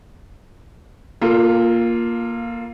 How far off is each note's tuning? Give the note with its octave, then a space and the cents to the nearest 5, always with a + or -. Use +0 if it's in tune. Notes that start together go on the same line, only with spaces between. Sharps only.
A#3 +10 F4 +0 A4 +35